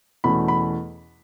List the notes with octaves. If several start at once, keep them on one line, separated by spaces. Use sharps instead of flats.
E2 B2 A3 C#4 B5
B5